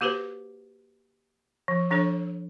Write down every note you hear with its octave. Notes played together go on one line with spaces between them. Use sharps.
A#3 F#4 G4 B4 C5
F3
F3 D4 A4 C#5